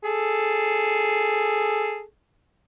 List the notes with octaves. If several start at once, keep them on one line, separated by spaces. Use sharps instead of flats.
G#4 A4